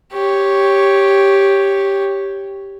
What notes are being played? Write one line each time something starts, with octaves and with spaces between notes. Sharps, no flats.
G4 C#5